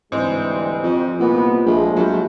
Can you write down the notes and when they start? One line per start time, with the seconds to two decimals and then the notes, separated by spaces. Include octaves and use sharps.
0.12 D2 G#2 E3 G3 C4
0.84 F2
1.20 C2 A#2 B3
1.66 A#1 F3 G#3 A3
1.97 A#1 F#3 G3